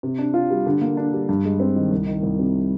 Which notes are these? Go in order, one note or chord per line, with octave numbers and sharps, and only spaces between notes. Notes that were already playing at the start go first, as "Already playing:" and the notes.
C3
D4
F4
G3
D3
A#3
D4
G3
G2
G#3
C4
D#3
C2
D#3
C2
C3